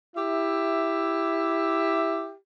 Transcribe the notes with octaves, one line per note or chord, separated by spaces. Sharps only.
E4 G4 E5